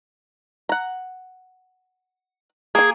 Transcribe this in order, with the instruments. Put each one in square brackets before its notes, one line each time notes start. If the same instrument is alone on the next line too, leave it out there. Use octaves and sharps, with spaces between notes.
[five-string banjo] F#5 A#5
[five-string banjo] A#3 G#5 [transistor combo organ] G#4